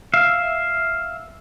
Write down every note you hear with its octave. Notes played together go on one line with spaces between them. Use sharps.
E5 F5